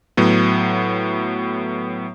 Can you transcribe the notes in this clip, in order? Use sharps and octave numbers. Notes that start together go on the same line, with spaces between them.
A2 F#3 B3